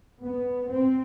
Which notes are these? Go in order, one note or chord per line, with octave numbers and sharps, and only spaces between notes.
B3
C4